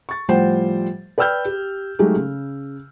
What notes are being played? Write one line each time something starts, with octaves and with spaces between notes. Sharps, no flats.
C#6 A6
A2 F3 G3 C5 F#5 G5
B4 D5 G5 E6 F6 G6
G4
F#3 G#3 A3 D#4 G4 G#4
C#3